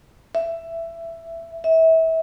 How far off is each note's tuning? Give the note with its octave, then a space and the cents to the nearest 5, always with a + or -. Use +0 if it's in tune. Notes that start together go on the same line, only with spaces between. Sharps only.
E5 +15
E5 -30